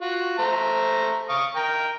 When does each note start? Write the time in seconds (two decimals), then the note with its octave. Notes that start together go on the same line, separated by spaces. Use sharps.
0.01 F4 F#4
0.39 A3 C5 A#5
1.29 F5 C#6 D#6
1.56 A#4 G5 A#5